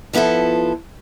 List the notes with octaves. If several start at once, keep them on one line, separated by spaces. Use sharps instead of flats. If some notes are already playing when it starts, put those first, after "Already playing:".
F3 B3 E4 F4 A4